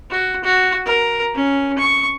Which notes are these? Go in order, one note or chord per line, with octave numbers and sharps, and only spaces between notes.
F#4
F#4
A#4
C#4
C#6